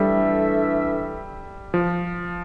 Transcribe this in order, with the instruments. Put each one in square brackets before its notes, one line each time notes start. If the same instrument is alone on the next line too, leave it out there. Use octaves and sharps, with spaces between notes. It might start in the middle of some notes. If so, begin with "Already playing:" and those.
Already playing: [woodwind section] E3 A3 D4 A4 E5 [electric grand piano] G3
[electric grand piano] F3